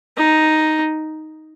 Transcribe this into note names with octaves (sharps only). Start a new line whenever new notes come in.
D#4